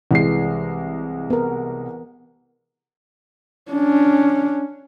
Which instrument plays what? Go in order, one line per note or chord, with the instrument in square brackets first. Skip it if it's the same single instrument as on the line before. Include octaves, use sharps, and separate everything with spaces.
[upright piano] C2 G#3 C7 [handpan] E3
[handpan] B3 A#4
[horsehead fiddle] C#4 D4